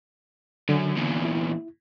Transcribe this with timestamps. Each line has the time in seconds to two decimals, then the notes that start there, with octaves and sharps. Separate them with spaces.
0.69 F#2 D3
0.97 E2 A#2
1.25 E4